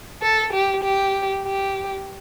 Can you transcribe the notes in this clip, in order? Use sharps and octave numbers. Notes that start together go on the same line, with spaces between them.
A4
G4
G4
G4